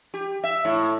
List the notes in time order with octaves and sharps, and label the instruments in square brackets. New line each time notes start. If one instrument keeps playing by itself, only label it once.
[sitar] G4
E5
A2